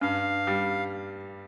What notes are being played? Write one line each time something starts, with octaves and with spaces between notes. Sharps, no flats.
G2 F5
G3